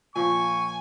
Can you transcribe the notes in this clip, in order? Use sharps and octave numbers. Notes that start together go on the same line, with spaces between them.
A#2 F3 G#5 C#6